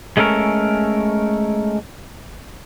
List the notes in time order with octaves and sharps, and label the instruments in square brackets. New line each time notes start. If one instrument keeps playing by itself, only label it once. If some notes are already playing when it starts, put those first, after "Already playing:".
[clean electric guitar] G#3 A3 C#4 A4 A#4